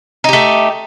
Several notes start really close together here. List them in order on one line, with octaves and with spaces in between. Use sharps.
D#4 G4 A3